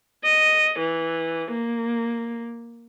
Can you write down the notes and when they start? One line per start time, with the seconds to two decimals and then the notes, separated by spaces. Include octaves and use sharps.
0.24 D#5
0.79 E3
1.51 A#3